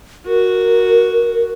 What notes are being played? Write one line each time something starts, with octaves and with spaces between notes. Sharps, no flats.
F#4 A#4